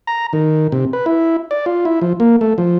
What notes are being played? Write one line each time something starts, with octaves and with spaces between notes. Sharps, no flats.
A#5
D#3
C3
B4
E4
D5
F4
E4
F3
A#3
A3
F3